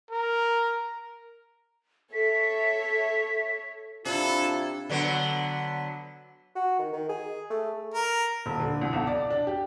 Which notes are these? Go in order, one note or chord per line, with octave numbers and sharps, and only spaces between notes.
A#4
A4 C#5 E5 B6
C3 D4 E4 F4 A4
D3 F#3 B3
F#4
D#3
D#3
G#4
A3
A#4
D#1
D3
C2
B1
D5
D4
G4